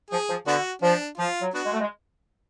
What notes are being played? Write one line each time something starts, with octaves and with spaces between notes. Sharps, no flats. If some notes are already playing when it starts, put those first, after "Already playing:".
F3 G#4
F3
D3 B3 D4 F#4
F3 D4
F3 F4
F#3
B3 D4 F#4
G#3
A3
G#3